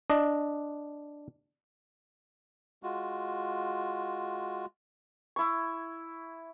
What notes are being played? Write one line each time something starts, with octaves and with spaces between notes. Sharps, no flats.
D4 D#5
G#3 F4 F#4
E4 C#6